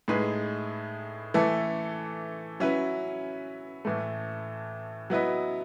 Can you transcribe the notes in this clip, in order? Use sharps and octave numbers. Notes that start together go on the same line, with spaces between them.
A2 G#3 D#4 G#4 B4
E3 A3 E4 A4
F#3 C#4 E4 B4
A2 E3 A3
F#3 B3 E4 B4 D#5